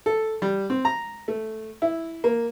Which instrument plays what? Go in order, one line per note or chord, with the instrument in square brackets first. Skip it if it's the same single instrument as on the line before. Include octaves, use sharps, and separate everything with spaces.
[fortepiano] A4
G3
C4
A#5
A3
E4
A#3